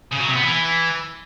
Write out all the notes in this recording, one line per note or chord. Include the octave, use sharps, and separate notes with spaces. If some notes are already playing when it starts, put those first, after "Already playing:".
C#3
F#3
C3
B3
E3